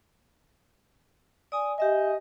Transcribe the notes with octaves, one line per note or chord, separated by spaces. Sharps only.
D5 G#5 D#6
G4 D#5 E5 G#5